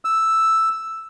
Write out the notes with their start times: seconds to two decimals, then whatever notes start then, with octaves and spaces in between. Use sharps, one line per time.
0.05 E6